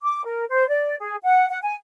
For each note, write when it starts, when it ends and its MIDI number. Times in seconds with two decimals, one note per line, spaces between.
0.03 0.21 86
0.24 0.44 70
0.49 0.66 72
0.68 0.95 74
0.99 1.15 68
1.23 1.46 78
1.49 1.58 78
1.63 1.74 80